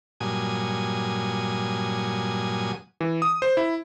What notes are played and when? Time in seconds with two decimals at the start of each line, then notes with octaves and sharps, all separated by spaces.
0.20 G2 A#2 F#3 G#5 D#6
3.01 E3
3.22 D#6
3.42 C5
3.57 E4